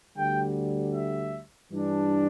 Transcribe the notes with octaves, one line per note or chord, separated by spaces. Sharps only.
D2 D3 G3 G5
E5
G2 E3 G3 D4